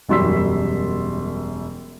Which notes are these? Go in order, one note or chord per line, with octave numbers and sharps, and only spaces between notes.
E1 F#2 G3 C6 E6 B6